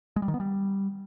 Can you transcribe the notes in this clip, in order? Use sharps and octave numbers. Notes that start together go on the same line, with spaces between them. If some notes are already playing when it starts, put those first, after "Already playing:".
G#3
G3
D#3
B3
G3